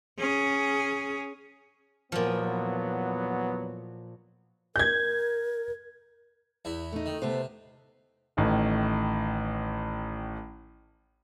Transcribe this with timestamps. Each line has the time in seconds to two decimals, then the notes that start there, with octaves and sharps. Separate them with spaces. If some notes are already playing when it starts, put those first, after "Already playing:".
0.19 C#4 G#4
2.12 E2 A#2 F3 F#3 B3
4.76 A#4 G6 G#6
6.65 E2 E4
6.92 A3 D#4
7.06 D#3
7.22 C3 A3 B3 C5
8.37 A1 A2 D#3